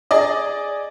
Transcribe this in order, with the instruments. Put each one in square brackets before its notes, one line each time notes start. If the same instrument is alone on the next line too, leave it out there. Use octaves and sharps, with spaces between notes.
[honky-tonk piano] G#4 D5 D#5